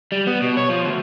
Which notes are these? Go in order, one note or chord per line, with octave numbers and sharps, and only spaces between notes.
G3
B3
B2
C#5
F3
D2